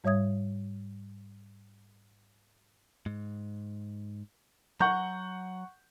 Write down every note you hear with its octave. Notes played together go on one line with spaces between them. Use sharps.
G#2 G3 C#5 E5 D#6 G#6
G#2
F#3 F#5 A#5 C#6 G6